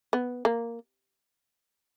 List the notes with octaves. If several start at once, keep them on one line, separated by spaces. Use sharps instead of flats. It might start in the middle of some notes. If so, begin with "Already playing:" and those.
B3
A#3